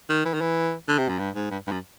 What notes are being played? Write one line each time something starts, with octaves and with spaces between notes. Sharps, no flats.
D#3
E3
D#3
E3
D3
C3
F#2
G2
G#2
G2
G2
F#2